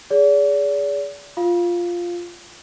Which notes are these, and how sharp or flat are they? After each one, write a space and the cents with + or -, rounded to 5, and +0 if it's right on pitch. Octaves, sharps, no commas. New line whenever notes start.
G#4 +0 D5 -40
F4 +0 F5 +0